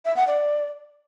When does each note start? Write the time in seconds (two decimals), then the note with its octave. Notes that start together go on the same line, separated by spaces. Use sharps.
0.05 E5
0.16 F#5
0.27 D5